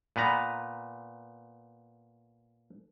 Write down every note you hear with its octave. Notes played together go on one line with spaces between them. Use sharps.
A#2 B3 B4 A#5